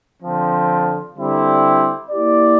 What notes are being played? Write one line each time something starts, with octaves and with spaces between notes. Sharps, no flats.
D3 F3 C4
D3 G3 C4 E4 G4
A#3 E4 G4 D5